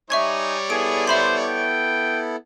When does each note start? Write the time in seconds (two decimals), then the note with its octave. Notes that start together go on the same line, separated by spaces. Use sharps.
0.10 G3 D#4 C#5 D5 E5 G#5 C#6 G#6
0.70 B3 E4 G#4 A4 D7
1.08 C5 E5 B5 C6
1.43 G5